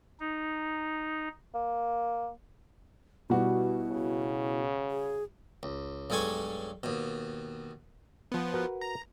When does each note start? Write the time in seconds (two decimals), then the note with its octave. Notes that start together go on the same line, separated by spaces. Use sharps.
0.20 D#4
1.55 A#3
3.30 B2 G3 E4 F#4
3.91 C#3
4.90 G#4
5.63 C#2
6.10 B1 G2 G#3 A4 G#5 C#6
6.83 D#2 B2
8.32 F3 B3
8.53 F#4 A#4 B4
8.81 A#5